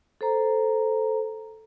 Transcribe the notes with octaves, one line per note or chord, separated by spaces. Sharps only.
A4 C5 A#5